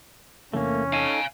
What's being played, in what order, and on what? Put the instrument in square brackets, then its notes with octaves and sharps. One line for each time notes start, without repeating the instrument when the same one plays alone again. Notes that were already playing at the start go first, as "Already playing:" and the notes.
[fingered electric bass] E2 C3 E3 [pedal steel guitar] A3 A#3 [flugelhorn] C#4
[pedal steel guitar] D#4 A4 [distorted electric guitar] F5 G#5